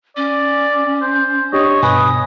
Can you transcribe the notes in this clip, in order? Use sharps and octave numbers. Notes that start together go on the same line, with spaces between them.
C#4 D5
C5
D4 G4 C#5 D#5
G2 B2 B4 G#5 D#6